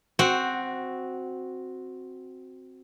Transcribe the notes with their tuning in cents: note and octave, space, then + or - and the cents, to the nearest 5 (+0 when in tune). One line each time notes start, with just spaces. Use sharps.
C4 +0 F#4 -5 F#5 +15